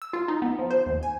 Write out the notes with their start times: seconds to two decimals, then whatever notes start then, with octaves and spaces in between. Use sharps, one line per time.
0.02 E6
0.13 F4
0.28 D#4
0.42 B3
0.59 F3
0.71 C5
0.86 D#2
1.03 G#5